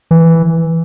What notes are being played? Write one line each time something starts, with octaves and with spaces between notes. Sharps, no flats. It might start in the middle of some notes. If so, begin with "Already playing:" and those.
E3